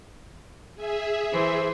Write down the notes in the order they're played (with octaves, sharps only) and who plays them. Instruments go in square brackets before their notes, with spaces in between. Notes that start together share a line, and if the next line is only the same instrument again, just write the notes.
[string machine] G#4 E5
[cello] E3 C5